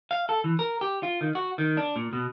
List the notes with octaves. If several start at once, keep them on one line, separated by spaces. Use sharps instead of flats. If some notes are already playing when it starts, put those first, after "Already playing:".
F5
A4
E3
A#4
G4
F4
D#3
F#4
D#3
D4
A#2
B2